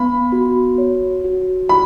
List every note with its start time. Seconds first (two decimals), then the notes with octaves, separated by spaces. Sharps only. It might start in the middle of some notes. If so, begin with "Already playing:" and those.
Already playing: B3 B5
0.32 F#4
0.78 C#5
1.24 F#4
1.69 E4 B5